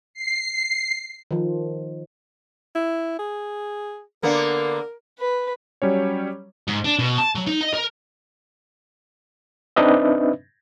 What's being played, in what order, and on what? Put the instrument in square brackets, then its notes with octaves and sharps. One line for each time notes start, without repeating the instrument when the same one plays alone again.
[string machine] C7
[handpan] D#3 F3
[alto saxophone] E4
G#4
[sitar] D3 A#3 B3 [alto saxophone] A#4
[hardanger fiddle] B4
[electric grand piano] F#3 G3 C#4 C#5
[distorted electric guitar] G#2
D4
B2
A5
F#3
D#4
D#5
A#4
[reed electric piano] C4 D4 D#4 B4 D#5 E5